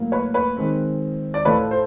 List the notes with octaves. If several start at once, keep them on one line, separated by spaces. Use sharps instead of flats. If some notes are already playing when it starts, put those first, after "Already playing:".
Already playing: A2 F#3 A#3
B4 C#5
B4 C#5
D#3 G#3 C4
D5
A2 F3 A3 B4 C#5
C5